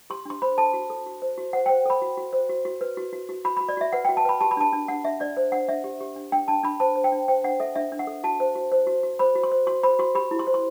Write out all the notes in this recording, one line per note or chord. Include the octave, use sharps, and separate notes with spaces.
G4 C6
D4 C6
C5 B5
A4 A5
F#4
A4
F#4
C5
F#4
C5 F#5
C5 G5
A4 B5
F#4
F#4
C5
F#4
F#4
B4
F#4
F#4
F#4
F#4 B5
F#4 B5
D5
F#4 E5
B4 F#5
F#4 G5
A5
B4 B5
G4 A5
B5
D4 A5
D4
D4 F#5
D4 E5
D4 D5
C5
D4 F#5
D4 E5
G4
G4
D4
D4 G5
D4 A5
D4 B5
C5 A5
C5
G5
D4
C5 G5
D4 F#5
A4 E5
D4 E5
D4
F#5
A4
F#4 A5
C5
F#4
C5
F#4
F#4
C5 B5
F#4
C6
C5
F#4 C6
C5 B5
F#4 C6
G4 B5
E4
C6
C5
C6